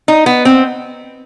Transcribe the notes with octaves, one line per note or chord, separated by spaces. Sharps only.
D#4
B3
C4